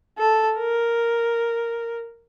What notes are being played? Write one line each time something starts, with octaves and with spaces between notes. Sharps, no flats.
A4
A#4